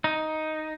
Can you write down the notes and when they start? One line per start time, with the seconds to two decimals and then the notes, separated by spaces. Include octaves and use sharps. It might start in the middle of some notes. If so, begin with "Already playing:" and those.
0.04 D#4